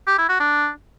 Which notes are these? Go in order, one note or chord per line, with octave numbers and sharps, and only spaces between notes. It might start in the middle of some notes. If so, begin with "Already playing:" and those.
G4
E4
F#4
D4